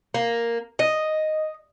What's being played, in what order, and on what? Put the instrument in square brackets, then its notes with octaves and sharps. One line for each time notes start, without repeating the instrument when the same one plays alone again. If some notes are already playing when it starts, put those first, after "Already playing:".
[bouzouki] A#3
D#5